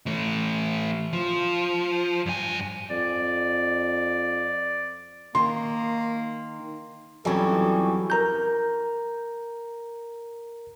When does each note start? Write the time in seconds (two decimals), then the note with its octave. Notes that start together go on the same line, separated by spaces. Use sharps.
0.06 E3 A3
1.13 F3
2.26 G2 G#5
2.90 F2 D5
5.35 D#3 A#3 C6
7.25 F2 E3 F#3 G3 C#4 A4
8.10 A#4 A#5 G6